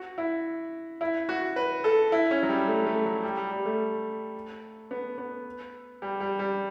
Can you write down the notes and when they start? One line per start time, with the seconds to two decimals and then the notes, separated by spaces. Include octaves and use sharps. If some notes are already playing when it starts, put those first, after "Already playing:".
Already playing: F#4
0.18 E4
1.01 E4
1.29 F#4
1.56 B4
1.84 A4
2.12 E4
2.31 C#4
2.43 F#3
2.49 G3
2.68 A3
2.86 A3
3.05 F#3
3.23 G3
3.37 G3
3.51 G3
3.66 A3
4.91 B3
5.18 B3
6.02 G3
6.20 G3
6.39 G3